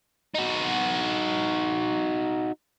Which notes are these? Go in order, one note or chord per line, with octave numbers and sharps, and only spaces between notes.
D#4 F#4